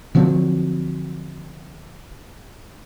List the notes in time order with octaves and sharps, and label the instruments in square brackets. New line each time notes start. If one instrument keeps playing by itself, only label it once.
[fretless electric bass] D3 F3 F#3 C4